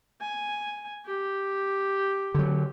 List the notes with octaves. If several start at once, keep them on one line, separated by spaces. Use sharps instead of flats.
G#5
G4
D3 F#3